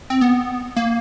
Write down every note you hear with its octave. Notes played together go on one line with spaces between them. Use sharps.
C4
B3
A#3